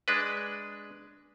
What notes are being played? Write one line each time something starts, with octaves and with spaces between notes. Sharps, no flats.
G#3 D4 B4